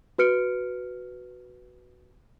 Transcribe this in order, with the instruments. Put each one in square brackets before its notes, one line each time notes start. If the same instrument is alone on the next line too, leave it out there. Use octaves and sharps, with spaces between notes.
[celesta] F#4 B4 F6 C#7 D7